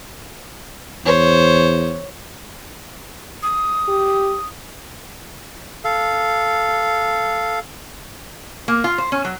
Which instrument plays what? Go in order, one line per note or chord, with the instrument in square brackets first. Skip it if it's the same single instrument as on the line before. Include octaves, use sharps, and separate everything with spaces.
[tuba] E2 [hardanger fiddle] C5 C#5
[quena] D#6
[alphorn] G4
[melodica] A4 F5
[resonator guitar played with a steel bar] A#3
F4
C5
C#4
F#3